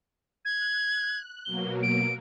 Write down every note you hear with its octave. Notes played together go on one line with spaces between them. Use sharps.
F#6 G#6
B2 F#3 A#3 G7
D7